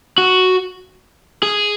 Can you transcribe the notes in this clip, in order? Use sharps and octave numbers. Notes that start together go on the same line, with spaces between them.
F#4
G#4